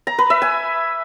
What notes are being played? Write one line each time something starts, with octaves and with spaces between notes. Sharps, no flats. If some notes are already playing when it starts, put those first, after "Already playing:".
A#5
B4
E5
G#5